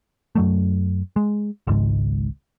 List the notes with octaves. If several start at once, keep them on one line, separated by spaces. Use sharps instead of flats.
F#2 F#3 A3
G#3
G#1 C#2 G#2